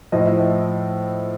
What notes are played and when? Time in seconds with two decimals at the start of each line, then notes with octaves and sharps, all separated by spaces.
0.12 A2 F3 D#5
0.26 E5
0.39 D#5